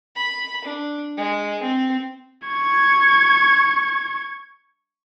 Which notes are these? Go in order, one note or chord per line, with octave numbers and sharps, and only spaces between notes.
B5
D4
G#3
C4
C#6 G#6